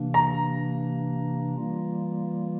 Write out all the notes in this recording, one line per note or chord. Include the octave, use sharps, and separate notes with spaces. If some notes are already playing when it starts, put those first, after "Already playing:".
Already playing: C3 E3 A#3 D4
A#5
E3 G3 A#3 F4